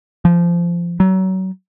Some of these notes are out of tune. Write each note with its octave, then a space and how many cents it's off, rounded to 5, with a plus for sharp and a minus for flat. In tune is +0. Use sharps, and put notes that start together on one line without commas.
F3 -20
F#3 +30